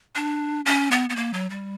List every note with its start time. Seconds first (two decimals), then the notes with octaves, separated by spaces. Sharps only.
0.16 D4
0.66 C#4
0.91 B3
1.10 B3
1.16 A#3
1.33 F#3
1.50 G3